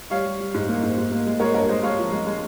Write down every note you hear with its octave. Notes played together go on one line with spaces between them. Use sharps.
G3 C#5 F5
G3
G3
G#2
A#3
G#2
G#2
A#3
G#3
G#3 A#4 C#5
G2 A#4 C#5
G#3 C5 D#5
G#3 C#5 F5
F3
G#3
G#3